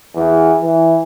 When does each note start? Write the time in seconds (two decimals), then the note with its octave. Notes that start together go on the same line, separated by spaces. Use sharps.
0.15 E2
0.62 E3